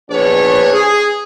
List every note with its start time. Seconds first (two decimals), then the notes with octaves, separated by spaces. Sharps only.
0.10 A#1 E2 D4 B4 C#5
0.73 G#4